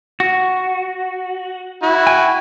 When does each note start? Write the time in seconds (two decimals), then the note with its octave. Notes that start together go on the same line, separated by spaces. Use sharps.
0.20 F#4
1.83 E4 F#4
2.07 G5 G#5